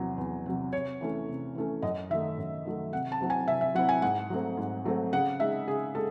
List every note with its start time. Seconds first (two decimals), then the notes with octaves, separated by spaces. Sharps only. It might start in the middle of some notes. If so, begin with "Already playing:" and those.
Already playing: E2 C3 F#3
0.18 E2
0.46 C3 F#3
0.73 C3 C#5
1.01 E3 A3 C#4
1.29 C3
1.55 E3 A3 C#4
1.82 F#2 D#5
2.10 D#3 F#3 A3 E5
2.38 F#2
2.65 D#3 F#3 A3
2.92 C3 F#5
3.12 A5
3.20 F#3 C4 E4
3.30 G#5
3.48 C3 E5
3.61 E5
3.75 F#3 C4 E4 F#5
3.89 G#5
4.02 G#2 F#5
4.30 F#3 A3 C4
4.57 G#2
4.85 F#3 A3 C4
5.13 C#3 F#5
5.40 G#3 D#4 E5
5.68 C#3 G#4
5.95 G#3 A4